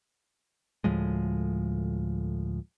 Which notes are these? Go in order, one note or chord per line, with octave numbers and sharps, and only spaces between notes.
D2 A2 F3 G#3